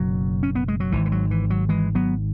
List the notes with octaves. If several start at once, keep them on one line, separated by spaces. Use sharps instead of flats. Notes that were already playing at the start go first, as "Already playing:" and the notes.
Already playing: F#1 B2 F#3
C#4
B3
G#3
F#3
G#1 G#2 E3
E3
F#3
E3
F#3
E3 G#3
F#3 B3